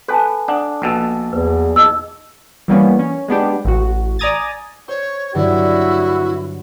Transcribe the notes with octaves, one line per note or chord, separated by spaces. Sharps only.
A4 B4 G#5 A5
D4 F#5 D#6
A#1 B2 A4
E2 B4
D#4 G#4 D#5 E6
E3 G3 A#3 B3 C#4
C#4
G#3 B3 D4 G4
A1 F#4
D5 G#5 A#5 D#6 G#6 A6
C5 C#5 C6 C#6
G2 D3 F#3 E4 F#4